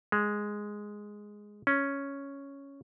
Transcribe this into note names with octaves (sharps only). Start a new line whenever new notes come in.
G#3
C#4